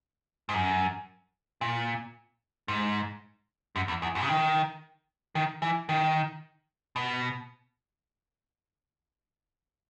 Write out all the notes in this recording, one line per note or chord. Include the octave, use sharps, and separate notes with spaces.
G#2
F#2
A#2
G#2
F#2
E2
E2
F#2
C#3
D#3
D#3
E3
D#3
B2